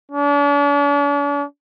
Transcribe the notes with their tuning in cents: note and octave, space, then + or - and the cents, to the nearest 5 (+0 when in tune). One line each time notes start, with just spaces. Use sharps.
D4 -45